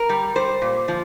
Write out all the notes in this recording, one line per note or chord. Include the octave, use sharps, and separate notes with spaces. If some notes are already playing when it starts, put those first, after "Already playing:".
Already playing: A#4
G3
G3 C5
A#2
F3